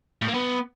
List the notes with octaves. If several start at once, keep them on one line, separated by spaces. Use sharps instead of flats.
A2
A#3
B3